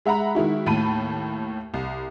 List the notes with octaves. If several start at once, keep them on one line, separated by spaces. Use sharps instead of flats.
G#3 E5 F#5 A#5 B5
D#3 G#3 E4 F#4
D#2 A2 A5 B5 D#7
C2